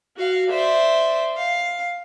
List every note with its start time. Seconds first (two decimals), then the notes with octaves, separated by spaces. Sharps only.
0.16 F#4 F5
0.51 C5 D5 E5
1.37 F5